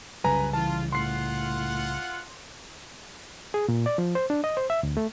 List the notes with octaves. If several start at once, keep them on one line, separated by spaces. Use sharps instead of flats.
C2 F#2 C#3 G3 B4 G#5 A#5
E3 F4 A5
A2 F4 F#5 C6 C7
G#4
A#2
D5
F3
C5
D4
D#5
C5
E5
D2
A3